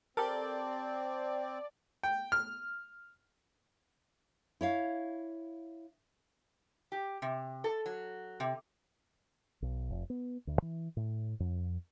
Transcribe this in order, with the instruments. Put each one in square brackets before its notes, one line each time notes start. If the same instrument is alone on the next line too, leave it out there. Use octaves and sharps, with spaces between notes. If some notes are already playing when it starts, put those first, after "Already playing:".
[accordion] C4 [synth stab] G4 A4 A#4 [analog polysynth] D5 [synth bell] G5 A5
[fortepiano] G5
F6
[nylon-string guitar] E4 C#5 F5
[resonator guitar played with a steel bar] G4
C3
A4
F#3
C3
[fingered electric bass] B1
F1
B3
D2
E3
A2
F2